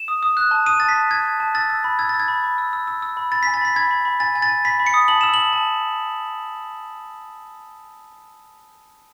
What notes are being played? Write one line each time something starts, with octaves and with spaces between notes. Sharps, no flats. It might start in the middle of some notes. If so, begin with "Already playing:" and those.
Already playing: E7
D#6
D#6
F#6
A5
D#6 D#7
A5 A6
B6
A5
A5 G#6
A5
A5
E6 A6
E6
B5
E6 G#6
E6 A6
G#6
B5
B5
E6
E6
E6
E6
B5
B5 A6
G#5 B6
A6
B5 B6
B5 G#6
B5
B5
G#5 A6
G#5
A6
G#5
B5 B6
B5
C#7
D#6
A5 F#7
E6 E7
A5 F#7
A5